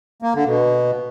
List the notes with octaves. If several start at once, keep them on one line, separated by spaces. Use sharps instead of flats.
A#3
D3
B2